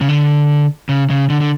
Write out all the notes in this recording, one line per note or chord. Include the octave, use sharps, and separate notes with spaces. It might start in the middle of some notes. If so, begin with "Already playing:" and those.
C#3
D3
C#3
C#3
D3
D3